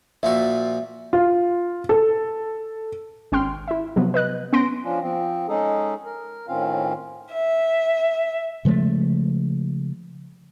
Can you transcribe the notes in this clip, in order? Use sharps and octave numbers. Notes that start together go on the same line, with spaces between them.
A#2 F3 F#4 E5
F4
A4
G#1 C#4 G5 C6 F6
E4 E5
C3 F3 F#3 B3
B4 D#5 F#6
B3 C#4 C6 A#6 D7
F3 C#4 D4 F4
F3 C4
G#3 C#4 D#4 G#4 A4
A#4
A2 D#3 C4 C#4 F4 F5
E5
C#3 F3 G#3 A3